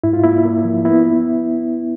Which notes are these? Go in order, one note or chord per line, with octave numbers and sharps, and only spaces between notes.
G#2 E4
F4
A#3 E4
A#3
F3
B3 E4